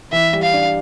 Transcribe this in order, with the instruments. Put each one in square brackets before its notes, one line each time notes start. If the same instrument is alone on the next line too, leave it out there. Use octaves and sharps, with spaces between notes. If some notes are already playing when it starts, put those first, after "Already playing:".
[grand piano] E3 [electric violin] E5
[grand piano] G3
[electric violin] F5
[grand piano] D4